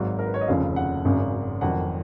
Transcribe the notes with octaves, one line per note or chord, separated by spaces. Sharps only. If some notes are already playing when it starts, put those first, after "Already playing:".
Already playing: G#1 G#2 F#3
A#4
B4
C#5
D#5
F1 D#2 C#3 F3 F5
F#5
G#1 F#2 C#3
F1 F2 D#3 F#3 F#5